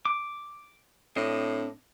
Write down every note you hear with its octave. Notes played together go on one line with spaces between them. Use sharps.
D6
A2 C4 D4 D#5